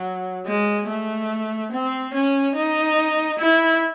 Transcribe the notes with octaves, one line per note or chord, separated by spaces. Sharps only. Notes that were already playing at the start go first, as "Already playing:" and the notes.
Already playing: F#3
G#3
A3
C4
C#4
D#4
E4